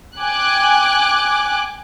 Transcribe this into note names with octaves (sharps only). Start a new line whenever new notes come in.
G5 G#5 D6 F#6